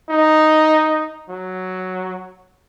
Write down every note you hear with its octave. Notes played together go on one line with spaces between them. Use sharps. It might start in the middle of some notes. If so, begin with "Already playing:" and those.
D#4
F#3